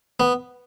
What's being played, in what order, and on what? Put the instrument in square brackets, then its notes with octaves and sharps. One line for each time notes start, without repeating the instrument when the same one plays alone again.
[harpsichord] B3